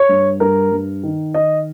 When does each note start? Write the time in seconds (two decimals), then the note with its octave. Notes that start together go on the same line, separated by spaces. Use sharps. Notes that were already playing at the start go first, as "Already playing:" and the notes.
Already playing: C#5
0.09 G2
0.40 G2 A#4
0.72 G2
1.03 D#3
1.34 D#3 D#5